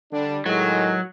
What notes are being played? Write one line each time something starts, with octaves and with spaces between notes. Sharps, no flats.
D3 G3 D4
A2 D#3 F#3 G#3